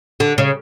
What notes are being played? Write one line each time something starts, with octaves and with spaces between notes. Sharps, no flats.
D3
C#3